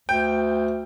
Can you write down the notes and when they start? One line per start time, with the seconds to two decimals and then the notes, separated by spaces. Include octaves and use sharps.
0.09 D2 G5